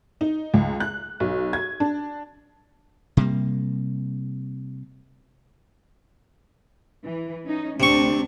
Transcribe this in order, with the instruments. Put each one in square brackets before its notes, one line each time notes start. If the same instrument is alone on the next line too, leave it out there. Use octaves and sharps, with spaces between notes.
[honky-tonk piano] D#4
C#2
F#6
B1
G#6
D4
[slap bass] C3 G3 A#3
[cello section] E3
C#4 D#4
[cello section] D2 C4 D4 [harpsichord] C3 C#6